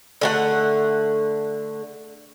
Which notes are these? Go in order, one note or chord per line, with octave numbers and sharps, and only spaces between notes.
D3 A3 F#5